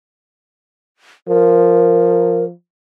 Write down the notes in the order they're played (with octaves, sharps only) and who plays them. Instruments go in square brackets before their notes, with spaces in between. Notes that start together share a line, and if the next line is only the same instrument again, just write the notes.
[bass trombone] F3 [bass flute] A#4